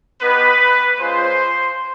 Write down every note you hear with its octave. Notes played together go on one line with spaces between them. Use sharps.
B3 D#4 G4 B4
G#3 C#4 F4 C5